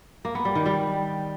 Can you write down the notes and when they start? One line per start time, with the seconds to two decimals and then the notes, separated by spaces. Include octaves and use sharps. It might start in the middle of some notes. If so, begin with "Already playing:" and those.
0.25 A#3
0.35 B3
0.45 G3
0.55 D#3
0.66 G3